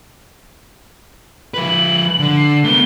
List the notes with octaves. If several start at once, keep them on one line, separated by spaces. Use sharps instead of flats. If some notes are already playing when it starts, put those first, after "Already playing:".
F3 B4 F#7
D3
C7
A3 B3 G7